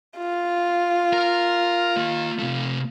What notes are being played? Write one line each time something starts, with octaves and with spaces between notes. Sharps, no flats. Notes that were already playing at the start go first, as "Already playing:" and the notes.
F4
A#4
A#3 D#5
C3 A3